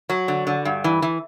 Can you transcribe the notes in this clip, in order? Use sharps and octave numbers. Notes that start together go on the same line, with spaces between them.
F#3 F#4
D3
D3
G2
E3
E3